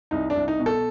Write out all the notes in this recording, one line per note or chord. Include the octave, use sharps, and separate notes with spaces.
C2 D#4
D4
C2
D#4
B2
A4